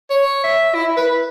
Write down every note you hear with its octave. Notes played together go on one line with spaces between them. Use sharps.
C#5
E5
E4
B4